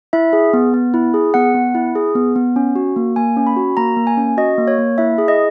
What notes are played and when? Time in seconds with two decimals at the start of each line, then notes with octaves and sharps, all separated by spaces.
0.13 E4 E5
0.33 G#4
0.53 B3
0.74 B3
0.94 E4
1.14 G#4
1.34 B3 F#5
1.55 B3
1.75 E4
1.95 G#4
2.15 B3
2.36 B3
2.56 C#4
2.76 F#4
2.96 A#3
3.16 A#3 G#5
3.37 C#4
3.47 B5
3.57 F#4
3.77 A#3 A#5
3.97 A#3
4.07 G#5
4.17 C#4
4.37 F#4 D#5
4.58 A#3
4.68 C#5
4.78 A#3
4.98 E4 E5
5.18 G#4
5.28 D#5